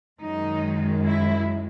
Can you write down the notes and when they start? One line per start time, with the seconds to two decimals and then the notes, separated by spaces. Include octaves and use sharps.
0.21 F#2 D#3 G#3 D#4
1.06 E4